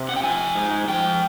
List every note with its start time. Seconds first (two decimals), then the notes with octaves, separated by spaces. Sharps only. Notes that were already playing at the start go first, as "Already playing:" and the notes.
Already playing: C3
0.09 F#5
0.16 G5
0.23 F3 G#5
0.55 G#2
0.88 F3 G5